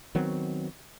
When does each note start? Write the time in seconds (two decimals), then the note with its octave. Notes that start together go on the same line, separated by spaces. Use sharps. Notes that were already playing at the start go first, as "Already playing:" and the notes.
0.15 D#3 F#3 B3 C4